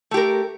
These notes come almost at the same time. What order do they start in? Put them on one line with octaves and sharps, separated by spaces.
A3 G4 A#4